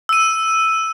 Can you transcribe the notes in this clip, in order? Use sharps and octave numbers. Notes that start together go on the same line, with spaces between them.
E6 D#7